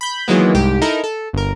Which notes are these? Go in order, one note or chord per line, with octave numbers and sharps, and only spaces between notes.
B5 G6
D#3 E3 F#3 G#3 A#3 B3
C2 G#2 G4
D#4 E4 A4 A#4
A4
G1 A#4